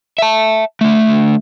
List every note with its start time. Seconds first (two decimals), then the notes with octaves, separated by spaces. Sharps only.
0.18 E5 A5
0.81 D3 A3